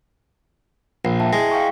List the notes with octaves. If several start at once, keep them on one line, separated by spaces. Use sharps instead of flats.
A#1 C7
E5 G5 A5
G#3 E4
F5 G5 C#6